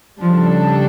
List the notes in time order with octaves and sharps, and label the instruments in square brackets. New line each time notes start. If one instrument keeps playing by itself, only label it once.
[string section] C#3 G3 D4 A4 [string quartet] F3